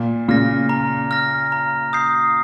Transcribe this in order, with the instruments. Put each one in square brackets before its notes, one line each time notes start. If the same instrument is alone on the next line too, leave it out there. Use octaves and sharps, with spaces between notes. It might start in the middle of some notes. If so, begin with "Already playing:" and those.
Already playing: [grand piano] A#2
[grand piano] A#2 C#3 [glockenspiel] F6 A#6
[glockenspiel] A#5
F6 A#6
A#5
D#6 G6 C7